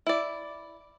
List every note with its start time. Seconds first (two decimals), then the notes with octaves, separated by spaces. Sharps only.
0.07 E4 D5